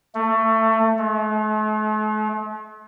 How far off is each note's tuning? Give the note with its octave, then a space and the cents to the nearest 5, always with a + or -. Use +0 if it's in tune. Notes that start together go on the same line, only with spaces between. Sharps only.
A3 +20
A3 -45